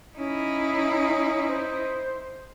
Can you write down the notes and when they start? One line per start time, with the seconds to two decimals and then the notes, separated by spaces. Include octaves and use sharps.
0.18 C#4 D#4 E4
1.49 C5